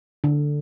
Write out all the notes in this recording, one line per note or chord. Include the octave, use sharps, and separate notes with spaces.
D3